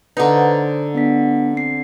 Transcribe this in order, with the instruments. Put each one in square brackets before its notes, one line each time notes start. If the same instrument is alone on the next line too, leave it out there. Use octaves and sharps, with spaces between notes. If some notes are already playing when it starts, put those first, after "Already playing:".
[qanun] D3 D#4 [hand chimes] B4 F#5 A#5
[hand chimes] C5
B3 D4 B6
C4 C7